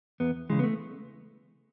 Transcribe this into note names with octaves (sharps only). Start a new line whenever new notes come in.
E2 B3
C#3 E3 G#3
B3
A3